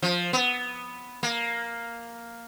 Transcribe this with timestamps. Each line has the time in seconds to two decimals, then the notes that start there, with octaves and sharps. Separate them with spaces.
0.02 F3
0.33 B3
1.23 A#3